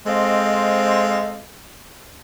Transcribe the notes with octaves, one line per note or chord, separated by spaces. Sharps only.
G#3 C4 A4 C5 D#5 F5